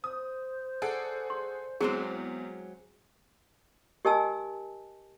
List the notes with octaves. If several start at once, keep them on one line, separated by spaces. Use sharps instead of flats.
C5 D#6
G#4 A4 D5 F#5
C6
E2 F#3 G#3 C4 G#4
G4 A#4 D#5 G#5 A5 E6